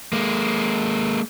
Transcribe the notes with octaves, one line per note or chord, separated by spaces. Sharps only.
G#3 A#3